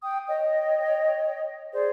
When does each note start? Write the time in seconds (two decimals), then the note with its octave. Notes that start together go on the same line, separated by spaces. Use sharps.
0.03 G5 D#6
0.28 C#5 D#5 G5
1.72 G#4 C5 D5